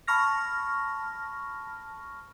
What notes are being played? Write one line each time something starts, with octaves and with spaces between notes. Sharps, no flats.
A5 B5 C#6 F6 A#6